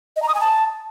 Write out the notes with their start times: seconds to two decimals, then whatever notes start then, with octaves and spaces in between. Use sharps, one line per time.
0.16 D#5
0.22 A#5
0.28 D#6
0.34 G#5
0.41 A5